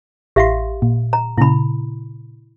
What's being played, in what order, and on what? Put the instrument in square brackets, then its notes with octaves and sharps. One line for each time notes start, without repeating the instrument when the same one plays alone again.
[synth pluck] A1 C6 [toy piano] G4 E5 F5
[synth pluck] A#2
[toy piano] A#5
[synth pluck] A#2 C#3 [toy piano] E4 B5